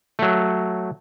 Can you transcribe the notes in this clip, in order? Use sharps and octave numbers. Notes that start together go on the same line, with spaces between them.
F#3 A3